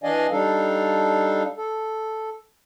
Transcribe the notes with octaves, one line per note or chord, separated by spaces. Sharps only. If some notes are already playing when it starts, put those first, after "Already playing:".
E3 D4 D5 D#5 F5 G#5
G3 D4 D#4 A4 F5
A4